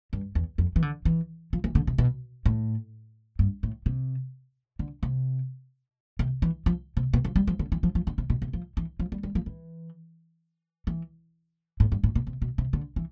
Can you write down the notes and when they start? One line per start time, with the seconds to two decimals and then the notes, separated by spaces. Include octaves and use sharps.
0.13 G2
0.35 E2
0.58 F2
0.76 E3
0.82 D3
1.05 E3
1.53 F3
1.64 E3
1.75 D3
1.87 C3
1.98 B2
2.46 A2
3.39 G2
3.63 A2
3.86 C3
4.79 D3
5.03 C3
6.19 C3
6.42 E3
6.66 F3
6.97 C3
7.13 B2
7.25 F3
7.36 G3
7.47 F3
7.59 D3
7.72 E3
7.83 F3
7.95 F3
8.07 D3
8.18 C3
8.30 B2
8.42 C3
8.53 F3
8.77 E3
9.00 F3
9.12 G3
9.23 G3
9.35 F3
9.46 E3
10.87 E3
11.80 A2
11.92 G2
12.04 A2
12.15 B2
12.27 C3
12.42 B2
12.58 C3
12.73 D3
12.96 E3